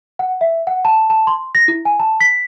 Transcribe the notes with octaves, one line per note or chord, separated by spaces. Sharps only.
F#5
E5
F#5
A5
A5
C6
A#6
E4
G#5
A5
B6